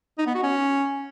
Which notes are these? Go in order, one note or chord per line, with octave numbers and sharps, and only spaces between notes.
D#4
B3
F#4
C#4